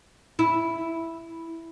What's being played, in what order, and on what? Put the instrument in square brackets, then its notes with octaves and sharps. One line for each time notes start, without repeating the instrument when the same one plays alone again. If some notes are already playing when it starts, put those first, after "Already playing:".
[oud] E4